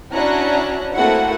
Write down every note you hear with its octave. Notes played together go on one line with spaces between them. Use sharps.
C#4 D4 E4 F#4 A#5 F#6
A3 A#3 C4 E4 F#4 F#5